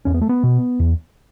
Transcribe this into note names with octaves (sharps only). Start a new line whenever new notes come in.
E2 C#4
B3
A3
B3
B2
E2